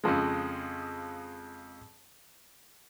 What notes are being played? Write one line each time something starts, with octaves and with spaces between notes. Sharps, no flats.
F2 C#3 F3 G#3